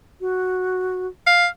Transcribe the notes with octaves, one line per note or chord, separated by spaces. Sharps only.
F#4
F5